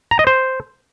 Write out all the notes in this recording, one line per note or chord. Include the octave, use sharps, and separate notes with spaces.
A#5
D#5
C5